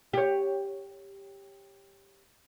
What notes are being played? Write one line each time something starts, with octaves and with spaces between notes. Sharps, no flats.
G4 C#5